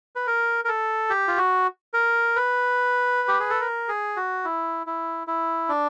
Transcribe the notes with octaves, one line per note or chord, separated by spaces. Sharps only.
B4
A#4
A#4
A4
G4
F4
F#4
A#4
B4
G4
G#4
A4
A#4
G#4
F#4
E4
E4
E4
D4